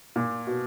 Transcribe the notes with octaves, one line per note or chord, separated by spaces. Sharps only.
A#2
B2